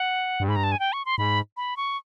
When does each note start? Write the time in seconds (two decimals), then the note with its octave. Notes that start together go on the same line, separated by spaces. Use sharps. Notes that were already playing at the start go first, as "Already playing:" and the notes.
Already playing: F#5
0.40 G2
0.48 G#2 B5
0.55 G2 A#5
0.64 A5
0.72 G#5
0.80 G5
0.93 C#6
1.05 C6
1.18 G#2 B5
1.57 B5
1.77 C#6